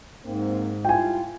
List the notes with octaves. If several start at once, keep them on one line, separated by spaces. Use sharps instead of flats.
G#2 A#3 C4
G3 E4 F4 G5 G#5